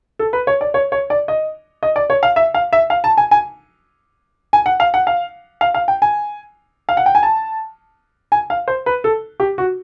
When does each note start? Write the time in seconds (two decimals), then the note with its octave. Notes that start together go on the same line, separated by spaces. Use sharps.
0.19 A4
0.33 B4
0.47 C#5
0.61 D5
0.74 C#5
0.92 C#5
1.10 D5
1.28 D#5
1.83 D#5
1.96 D5
2.10 C#5
2.23 F5
2.36 E5
2.54 F5
2.73 E5
2.90 F5
3.04 A5
3.17 G#5
3.31 G#5
4.53 G#5
4.66 F#5
4.80 F5
4.94 F#5
5.07 F5
5.61 F5
5.74 F5
5.88 G5
6.02 G#5
6.89 F5
6.97 F#5
7.06 G5
7.15 G#5
7.23 A5
8.32 G#5
8.50 F5
8.68 C5
8.86 B4
9.04 A4
9.40 G4
9.58 F#4